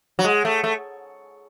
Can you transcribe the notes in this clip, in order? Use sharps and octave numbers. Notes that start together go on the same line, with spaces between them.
F#3
G#3
A3
A3